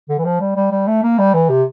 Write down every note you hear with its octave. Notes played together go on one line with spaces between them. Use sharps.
D3
E3
F3
G3
G3
G3
A3
A#3
G3
E3
C3